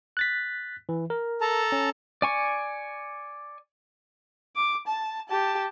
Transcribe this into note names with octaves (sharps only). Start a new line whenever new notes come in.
F#6 A6 B6
E3
A#4
A4 A5 A#5
C#4
D5 G#5 C#6
D6
A5
G4 A5